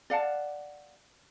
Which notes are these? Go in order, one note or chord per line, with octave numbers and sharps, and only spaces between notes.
D5 F5 F#5 A5